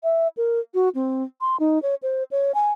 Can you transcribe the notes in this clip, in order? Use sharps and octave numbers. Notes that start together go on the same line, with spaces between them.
E5
A#4
F#4
C4
C6
D#4
C#5
C5
C#5
G#5